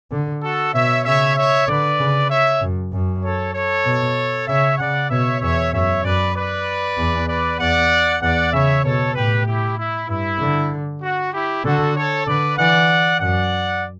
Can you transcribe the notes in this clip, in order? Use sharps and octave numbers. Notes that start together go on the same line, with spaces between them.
D3
F#4 A4
B2 C#5 E5
C#3 C#5 E5
C#5 E5
D3 B4 D5
C#3
C#5 E5
F#2
F#2
A4 C#5
A4 C#5
B2
C#3 C#5 E5
C#3 D5 F#5
B2 C#5 E5
E2 C#5 E5
F#2 C#5 E5
F#2 B4 D5
B4 D5
E2
B4 D5
E2 D5 F#5
E2 D5 F#5
C#3 C#5 E5
B2 A4 C#5
A2 G4 B4
E4 G4
E4
G2 E4
D3
F#4
E4 G4
D3 F#4 A4
A4 C#5
D3 B4 D5
E3 D5 F#5
F#2 D5 F#5